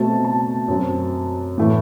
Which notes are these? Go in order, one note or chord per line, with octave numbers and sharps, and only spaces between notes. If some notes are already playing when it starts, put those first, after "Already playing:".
Already playing: B2 A3 C4 A5
A5
F#2 F#3 C4
A2 E3 A3